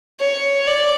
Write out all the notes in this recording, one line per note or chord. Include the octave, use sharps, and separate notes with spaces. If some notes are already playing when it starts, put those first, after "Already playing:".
C#5
D5